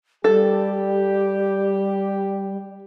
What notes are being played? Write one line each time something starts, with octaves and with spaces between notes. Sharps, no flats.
G3 G4 A4